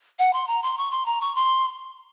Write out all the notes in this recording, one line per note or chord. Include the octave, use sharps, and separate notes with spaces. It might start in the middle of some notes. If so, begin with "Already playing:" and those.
F#5
C6
A#5
C6
C#6
C6
A#5
C#6
C6